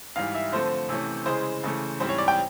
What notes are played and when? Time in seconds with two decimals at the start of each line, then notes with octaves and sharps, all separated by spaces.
0.16 G#2 E3 G3 F5
0.35 E5
0.52 D3 F3 A3 C4 C5
0.89 C3 E3 A3 C#4
1.26 C#3 E3 G#3 C5
1.64 C#3 E3 A3
2.00 G#2 E3 G3 C4 C5
2.09 C#5
2.18 D5
2.28 G5